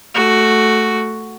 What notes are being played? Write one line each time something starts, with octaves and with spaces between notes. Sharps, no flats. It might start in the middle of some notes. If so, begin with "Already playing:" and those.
A3 F#4